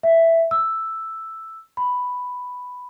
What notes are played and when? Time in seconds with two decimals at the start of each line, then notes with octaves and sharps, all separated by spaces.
0.03 E5
0.51 E6
1.77 B5